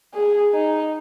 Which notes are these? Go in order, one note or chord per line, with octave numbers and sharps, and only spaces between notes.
G#4
D#4